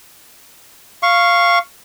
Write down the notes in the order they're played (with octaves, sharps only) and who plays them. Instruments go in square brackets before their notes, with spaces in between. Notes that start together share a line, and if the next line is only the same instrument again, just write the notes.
[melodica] F5 C#6